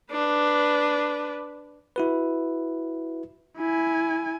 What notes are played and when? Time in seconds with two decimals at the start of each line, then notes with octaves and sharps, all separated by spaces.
0.12 D4 B4
1.96 E4 F#4 B4
3.58 E4 G#5